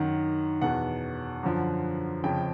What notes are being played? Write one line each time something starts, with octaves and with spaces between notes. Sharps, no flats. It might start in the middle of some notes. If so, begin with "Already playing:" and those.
Already playing: F#2 D#3 F#5
E2 B2 F#5
F#2 D3 F3
F2 C#3 F3 G5